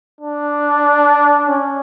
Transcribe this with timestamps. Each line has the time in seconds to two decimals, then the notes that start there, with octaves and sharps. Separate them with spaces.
0.21 D4
1.48 C#4